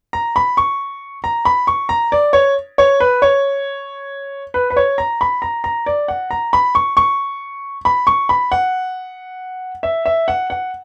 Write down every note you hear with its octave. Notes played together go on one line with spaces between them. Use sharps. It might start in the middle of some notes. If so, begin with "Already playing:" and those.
A#5
B5
C#6
A#5
B5
C#6
A#5
D5
C#5
C#5
B4
C#5
B4
B4
C#5
A#5
B5
A#5
A#5
D5
F#5
A#5
B5
C#6
C#6
B5
C#6
B5
F#5
E5
E5
F#5
F#5